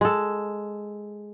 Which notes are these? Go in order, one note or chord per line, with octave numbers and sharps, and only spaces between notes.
G#3 A4